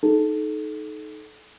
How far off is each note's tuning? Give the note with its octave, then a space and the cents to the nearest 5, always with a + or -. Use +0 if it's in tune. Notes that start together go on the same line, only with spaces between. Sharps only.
D#4 +0 A4 -30